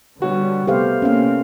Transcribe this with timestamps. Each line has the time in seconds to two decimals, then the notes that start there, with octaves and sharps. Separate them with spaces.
0.22 D3 G3 B3 F#4 C#5
0.67 C3 A3 B3 G4 C5 F5
1.02 C3 A#3 C4 C#4 F5